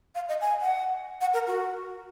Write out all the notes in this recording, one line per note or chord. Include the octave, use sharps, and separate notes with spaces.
F5
D#5
G#5
F#5
F#5
A#4
F#4